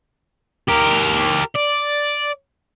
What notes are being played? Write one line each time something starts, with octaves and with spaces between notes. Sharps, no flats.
G4 A#4
D5